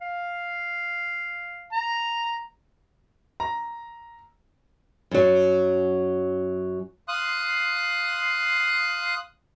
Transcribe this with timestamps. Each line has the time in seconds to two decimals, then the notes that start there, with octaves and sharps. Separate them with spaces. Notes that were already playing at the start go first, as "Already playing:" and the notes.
0.01 F5
1.72 A#5
3.40 A#5
5.11 F#2 F#3
7.08 F5 C6 D#6 F#6